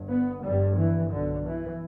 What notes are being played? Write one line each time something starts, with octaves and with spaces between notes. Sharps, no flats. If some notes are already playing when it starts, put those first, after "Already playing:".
Already playing: G1 G2
B3
G1 G2 G3
E3
B1 B2 D3
E3